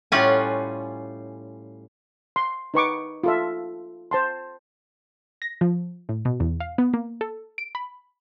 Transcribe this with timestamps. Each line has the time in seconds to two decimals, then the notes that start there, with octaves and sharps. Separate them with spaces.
0.12 A2 G3 C#4 F4 F#5 G#5
2.36 C6
2.74 D#4 B4 C#6 D6
3.23 F4 A4 E5
4.11 C5 A5 C6
5.42 A#6
5.61 F3
6.09 A2
6.25 B2
6.40 E2
6.60 F5
6.78 B3
6.93 A#3
7.21 A4
7.58 D7
7.75 B5